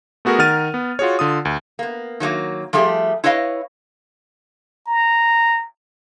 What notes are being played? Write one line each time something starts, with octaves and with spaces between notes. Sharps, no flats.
A3 B3 F#4 G#4 A#4
D#3 A#4 F#5 F6 A6 D#7
B3
F4 F#4 G#4 C#5
D3 F4 D#6
D2
A#3 B3
D#3 F#3 G#3 A#3
F3 G3 A3 G4 G#4
E4 B4 C#5 D#5 F5
A#5